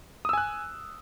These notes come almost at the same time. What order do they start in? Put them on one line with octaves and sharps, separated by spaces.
D#6 E6 G#5 F#6